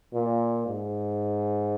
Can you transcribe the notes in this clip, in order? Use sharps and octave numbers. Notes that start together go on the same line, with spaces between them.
A#2
G#2